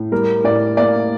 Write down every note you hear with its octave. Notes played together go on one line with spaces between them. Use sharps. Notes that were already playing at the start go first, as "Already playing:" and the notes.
Already playing: A2
G3 A#4
A2 D5
A#3 D5